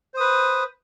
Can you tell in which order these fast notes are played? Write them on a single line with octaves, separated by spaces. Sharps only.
C5 D#6 B4